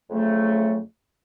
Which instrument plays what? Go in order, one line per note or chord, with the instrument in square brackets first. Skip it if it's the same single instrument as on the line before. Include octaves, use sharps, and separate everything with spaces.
[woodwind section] F2 C#3 F#3 A3